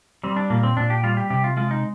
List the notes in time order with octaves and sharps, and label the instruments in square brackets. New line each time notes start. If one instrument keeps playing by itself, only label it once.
[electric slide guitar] G3 C4
D4
A#2 A#3
C4
A#2 D4
G4
G3 F4
G4
C3 G4
F4
G#3 F4
D#4